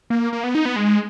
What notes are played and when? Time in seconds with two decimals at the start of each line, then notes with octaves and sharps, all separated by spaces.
0.10 A#3
0.33 A#3
0.44 B3
0.55 D#4
0.66 B3
0.76 G#3